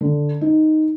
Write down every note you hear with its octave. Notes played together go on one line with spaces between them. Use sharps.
D3
D#4